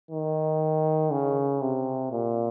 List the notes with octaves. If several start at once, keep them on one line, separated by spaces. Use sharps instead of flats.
D#3
C#3
C3
A#2